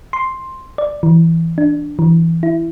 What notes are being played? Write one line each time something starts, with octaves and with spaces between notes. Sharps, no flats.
C6
D5
E3
D4
E3
E4